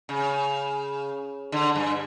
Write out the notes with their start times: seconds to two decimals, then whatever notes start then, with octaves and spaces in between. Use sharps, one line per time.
0.09 C#3
1.52 D3
1.75 G2